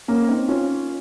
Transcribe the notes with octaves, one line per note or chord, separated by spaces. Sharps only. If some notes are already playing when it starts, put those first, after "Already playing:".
A#3 C#4
C4 D#4
C#4 F4